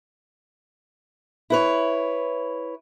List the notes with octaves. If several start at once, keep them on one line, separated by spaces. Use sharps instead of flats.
E4 B4 C#5